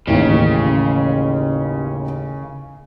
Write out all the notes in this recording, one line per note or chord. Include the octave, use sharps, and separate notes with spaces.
A1 D#2 C#3